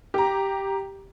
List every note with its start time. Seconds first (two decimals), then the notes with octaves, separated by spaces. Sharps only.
0.14 G4 A#5